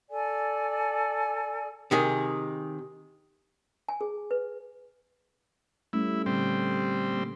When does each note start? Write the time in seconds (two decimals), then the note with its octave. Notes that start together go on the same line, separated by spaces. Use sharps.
0.10 A4 D5 G#5
1.91 C3 D#3 G#4
3.88 G#5
4.01 G#4
4.31 B4
5.93 G3 A3 C#4 E4
6.26 A#2 D3 G3 C4
7.13 A#3